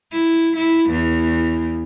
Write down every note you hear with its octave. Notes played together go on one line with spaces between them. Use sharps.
E4
E4
E2